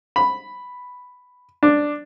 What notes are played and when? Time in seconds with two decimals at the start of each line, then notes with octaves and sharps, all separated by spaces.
0.16 B5
1.63 D4